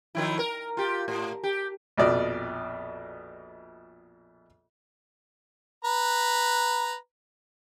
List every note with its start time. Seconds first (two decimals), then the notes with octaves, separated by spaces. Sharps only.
0.15 D#3 F3 E4
0.39 A#4
0.77 F4 G4
1.08 A2
1.43 G4
1.98 A#1 F2 B2 D5
5.85 B4 A#5